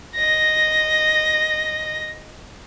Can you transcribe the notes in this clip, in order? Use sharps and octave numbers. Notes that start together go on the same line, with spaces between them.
D#5 A#6